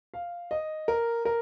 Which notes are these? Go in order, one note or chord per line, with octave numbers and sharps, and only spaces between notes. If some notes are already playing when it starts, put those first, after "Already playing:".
F5
D#5
A#4
A#4